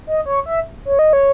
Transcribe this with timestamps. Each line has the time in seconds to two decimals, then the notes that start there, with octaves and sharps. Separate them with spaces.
0.07 D#5
0.26 C#5
0.46 E5
0.85 C#5
0.99 D#5
1.13 C#5